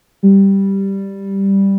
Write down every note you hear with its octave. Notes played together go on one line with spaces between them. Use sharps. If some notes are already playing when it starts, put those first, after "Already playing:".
G3